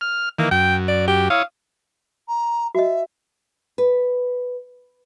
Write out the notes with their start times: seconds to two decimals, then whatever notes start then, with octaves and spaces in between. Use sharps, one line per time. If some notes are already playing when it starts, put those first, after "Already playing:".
0.01 F6
0.39 D#3 E3 A#3
0.51 F#2 G5
0.88 D5
1.08 G4
1.30 E4 C#5 F5 D#6
2.28 A#5
2.75 F#4 D#5 E5
3.78 B4